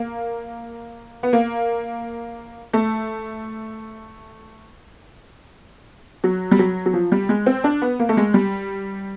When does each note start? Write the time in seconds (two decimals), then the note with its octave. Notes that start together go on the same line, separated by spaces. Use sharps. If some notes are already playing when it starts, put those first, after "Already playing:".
Already playing: A#3
1.23 B3
1.33 A#3
2.73 A3
6.24 F#3
6.51 G3
6.59 F#3
6.86 F#3
6.93 F3
7.12 G3
7.29 G#3
7.46 C4
7.64 D4
7.82 B3
7.99 A#3
8.09 A3
8.17 G#3
8.34 G3